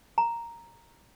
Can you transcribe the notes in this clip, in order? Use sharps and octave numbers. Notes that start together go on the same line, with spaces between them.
A#5